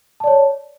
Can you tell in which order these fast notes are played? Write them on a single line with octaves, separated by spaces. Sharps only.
A5 D5 C#5